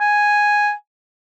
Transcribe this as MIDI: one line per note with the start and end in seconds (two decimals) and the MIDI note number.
0.01 0.72 80